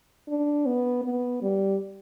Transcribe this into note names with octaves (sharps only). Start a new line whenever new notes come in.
D4
B3
B3
G3